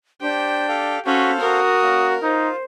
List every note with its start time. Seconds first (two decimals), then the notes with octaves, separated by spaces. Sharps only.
0.21 D4 G4 C5 G5
0.68 G4 A4 F5
1.06 C#4 F#4 A4 C5 F5 B6
1.40 F#4 A#4 D#6
1.82 A#3 C#4
2.23 D#4 F4 C5